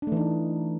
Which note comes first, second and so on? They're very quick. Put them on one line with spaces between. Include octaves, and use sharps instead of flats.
D4 A3 E3 D#4